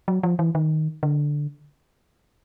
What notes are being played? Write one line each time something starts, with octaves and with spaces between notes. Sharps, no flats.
F#3
F3
E3
D#3
D3